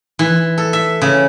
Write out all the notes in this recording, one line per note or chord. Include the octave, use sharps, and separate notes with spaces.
E3
A4
E5
C#3